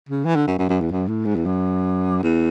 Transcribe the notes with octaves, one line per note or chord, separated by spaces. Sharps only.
C#3
E3
D3
F#2
F#2
F#2
E2
F#2
A2
G#2
E2
F#2
E2